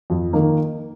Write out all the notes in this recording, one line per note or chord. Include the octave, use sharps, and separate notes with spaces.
F2
D#3 A#3 D#4